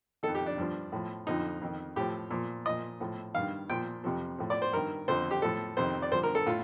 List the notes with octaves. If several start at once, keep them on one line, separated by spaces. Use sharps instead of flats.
D#3 A4
F2
G4
D4
G2 F3
A2 F3
F2 D3 F3 D#4
F2 D#3
A2 F3 G4
A#2 F3
A#2 F3 D#5
A2 F3
G2 D#3 F5
A#2 F3 G5
F2 C3 F3
A2 F3
D5
C5
G2 D#3 A#4
F2 D3 F3 C5
G4
A2 F3 A4
F2 C3 D#3 C5
D5
G2 D3 F3 C5
A#4
A4
A2 F4